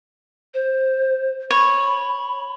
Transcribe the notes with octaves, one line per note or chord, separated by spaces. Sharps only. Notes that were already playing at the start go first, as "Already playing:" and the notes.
C5
C#5 B5